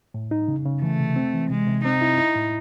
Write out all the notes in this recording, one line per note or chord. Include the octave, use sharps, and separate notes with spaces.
A2
D#4
C#3
C#3
E3 A3
C3
C4
E3
C3 G#3
C3
C4 D#4
E4
E4
A2